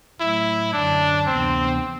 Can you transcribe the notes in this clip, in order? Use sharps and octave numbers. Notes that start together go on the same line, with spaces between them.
A2 F#3 A3 E4
F#2 D3 F#3 D4
D2 C3 E3 B3 C4 D4